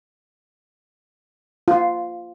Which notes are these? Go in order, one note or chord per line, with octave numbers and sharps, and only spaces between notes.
F4